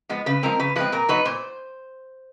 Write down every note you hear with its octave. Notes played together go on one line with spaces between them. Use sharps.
F3 G#3 B3
C#3 B4
F3 G#3 C4 A#4
C#3 B4
F3 G#3 C4 B4
A#2 A#4
F#3 B3 D#4 B4
A#2 C5